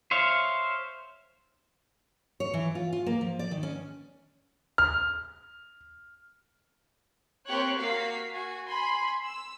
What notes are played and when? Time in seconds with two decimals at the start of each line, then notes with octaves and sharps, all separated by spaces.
0.11 C5 C#5 E5 F5
2.40 C#5
2.54 E3
2.75 F4
2.93 F4
3.06 A#3
3.21 F3
3.39 D5
3.51 D#3
3.63 C#4
4.78 F6
7.47 A#3 C4 G4 C#5 F#6
7.79 A#3 F#4 F5 B6 C7
8.31 F#4 G#5
8.66 G#5 B5 C6
9.25 E6